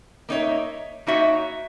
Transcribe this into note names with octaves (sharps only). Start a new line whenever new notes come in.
A#3 D#4 F#4 C#5 E5
A#3 D#4 F#4 C#5 E5